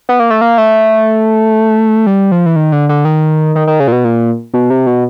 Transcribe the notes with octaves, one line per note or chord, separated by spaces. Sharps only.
B3
A#3
A3
A#3
A3
G3
F3
E3
D#3
D3
D3
D#3
D#3
D#3
C#3
A#2
B2
A#2
B2
C3
B2